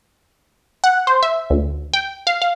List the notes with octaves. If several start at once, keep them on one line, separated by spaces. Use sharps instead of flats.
F#5
C5
E5
D2
G5
F5
F5